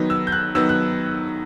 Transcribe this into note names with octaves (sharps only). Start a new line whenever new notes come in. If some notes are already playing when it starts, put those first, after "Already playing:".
Already playing: D#3 F#3 B3
E6
G6
F#6
D#3 F#3 B3 E6
F#6